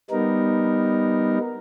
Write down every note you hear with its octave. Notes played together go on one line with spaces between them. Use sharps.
G3 B3 D#4 A#4